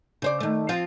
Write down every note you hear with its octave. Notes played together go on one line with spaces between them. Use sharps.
C#3 C5 D5
D#3 A3
F3 C4 F4